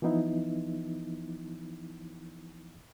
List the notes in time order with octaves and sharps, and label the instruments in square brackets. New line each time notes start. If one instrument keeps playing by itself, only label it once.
[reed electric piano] E3 F3 B3 D#4 E4